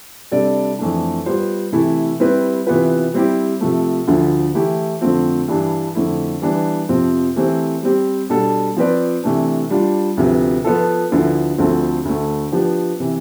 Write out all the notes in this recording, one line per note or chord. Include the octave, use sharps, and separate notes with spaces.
C3 G3 D4 A4 D5
F2 E3 A3 D4
G3 B3 F4 C5
C3 E3 A3 E4 A4
G3 C4 E4 G4 B4
C3 E3 B3 F4 B4
G3 C4 E4 G4
C3 F3 A3
D2 D3 F3
E3 A3 E4 G4
F2 D3 A3 C4 F4
G2 E3 G3 D4
F2 D3 A3 E4
E3 G3 B3 D4
F2 C3 F3 C4
E3 A3 C4 G4 C5
G3 C4 G4
B2 G3 D4 A4
F3 C4 F4 B4 D5
C3 E3 A3 D4
G3 D4 F4
D2 C3 F3 B3
F3 B3 F4 A4
D2 D3 F3 B3 E4
D2 D3 F3 A3 C4
D2 D3 A3
F3 B3 D4 G4
C3 E3